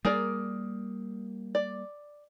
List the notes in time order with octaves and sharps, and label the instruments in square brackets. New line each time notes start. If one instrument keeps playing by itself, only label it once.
[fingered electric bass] G3 A#3 [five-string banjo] G#4 A#4 D5
[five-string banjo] D5